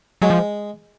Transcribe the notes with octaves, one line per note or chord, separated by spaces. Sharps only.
F#3 G#3
F3